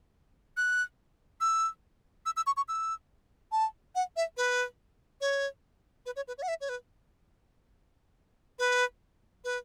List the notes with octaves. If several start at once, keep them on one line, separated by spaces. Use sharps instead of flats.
F#6
E6
E6
E6
C#6
C#6
E6
A5
F#5
E5
B4
C#5
B4
C#5
B4
C#5
F#5
E5
C#5
B4
B4
B4